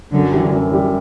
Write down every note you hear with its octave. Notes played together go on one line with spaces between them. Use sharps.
F#2 D3 F#3
E3 G3
F#2
E3 G3